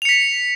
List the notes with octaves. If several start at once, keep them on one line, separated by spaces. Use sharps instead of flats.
B6 C#7 F7